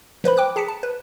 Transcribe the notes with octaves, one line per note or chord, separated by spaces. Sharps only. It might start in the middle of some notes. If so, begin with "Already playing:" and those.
F3 B4 C5 B5
G5 D6 F#6
G#4 A5 B6 C#7
A5
B4